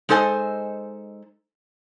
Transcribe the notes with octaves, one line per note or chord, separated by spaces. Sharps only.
G#3 D#4 A4 C5 G#5